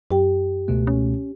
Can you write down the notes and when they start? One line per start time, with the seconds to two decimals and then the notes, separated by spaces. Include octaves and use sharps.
0.11 F#2 G4 G5
0.68 C#2 B2 A3
0.87 C#4